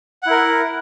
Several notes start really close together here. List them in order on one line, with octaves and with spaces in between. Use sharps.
F#5 E4 A#4